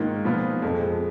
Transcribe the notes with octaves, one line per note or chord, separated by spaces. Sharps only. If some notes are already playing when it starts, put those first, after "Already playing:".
Already playing: G#2 D#3 A#3 F4
A#2 F3 B3 F4
F2 F3 G#3